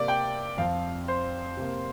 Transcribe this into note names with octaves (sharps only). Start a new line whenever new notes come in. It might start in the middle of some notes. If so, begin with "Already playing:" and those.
Already playing: C3 A#3 D5 D6
G5
F2 F3 C4 F5
C5
C3 A#3